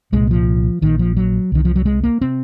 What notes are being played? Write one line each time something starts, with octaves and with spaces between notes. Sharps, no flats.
C2 A#2 G#3
F3
A#1 A#2 D#3
F3
F#3
C2 C3 D#3
F3
F#3
G#3
A#3
C3 C4